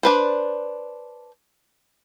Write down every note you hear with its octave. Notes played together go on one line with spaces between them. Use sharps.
D4 B4 C5